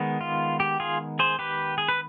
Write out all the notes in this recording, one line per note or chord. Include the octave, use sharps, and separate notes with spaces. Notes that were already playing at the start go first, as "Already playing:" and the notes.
Already playing: D#3 G#3 B3 D#4
F4
G4
F4 G#4
G#4 C5
G4 B4
G#4
B4